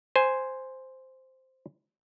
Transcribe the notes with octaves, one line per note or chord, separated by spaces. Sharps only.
C5 G#5